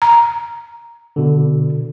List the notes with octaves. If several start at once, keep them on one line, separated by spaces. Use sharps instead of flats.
A#5
B2 D3